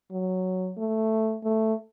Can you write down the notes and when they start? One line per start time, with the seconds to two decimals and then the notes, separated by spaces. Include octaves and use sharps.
0.11 F#3
0.78 A3
1.44 A3